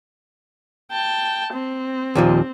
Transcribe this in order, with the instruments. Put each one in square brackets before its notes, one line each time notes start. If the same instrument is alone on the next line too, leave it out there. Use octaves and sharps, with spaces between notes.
[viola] G5 A5
C4
[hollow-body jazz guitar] D#2 A#2 F3